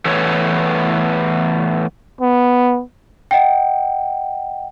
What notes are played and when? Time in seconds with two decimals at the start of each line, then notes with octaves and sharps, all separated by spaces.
0.05 E3 A3 B3 C#5
2.21 B3
3.31 D#5 F#5 G5